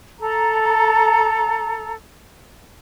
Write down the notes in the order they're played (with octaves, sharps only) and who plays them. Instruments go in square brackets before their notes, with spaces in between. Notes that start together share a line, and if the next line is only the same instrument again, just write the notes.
[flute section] A4 A#5